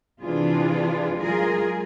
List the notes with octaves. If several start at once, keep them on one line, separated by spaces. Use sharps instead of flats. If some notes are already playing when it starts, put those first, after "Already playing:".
C3 E3 D4 F4 G#4
F#3 G#3 F4 G#4 A#4